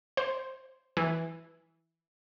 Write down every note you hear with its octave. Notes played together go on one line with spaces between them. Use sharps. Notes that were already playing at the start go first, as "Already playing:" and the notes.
C5
E3